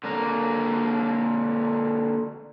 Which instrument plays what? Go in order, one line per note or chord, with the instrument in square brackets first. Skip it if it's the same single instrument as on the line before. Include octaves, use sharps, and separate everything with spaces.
[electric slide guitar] D3 A#3 A#4